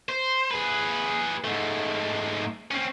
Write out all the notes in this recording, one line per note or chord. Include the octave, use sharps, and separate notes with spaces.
C5
G#4 B4
G#2 A3
C4 C#4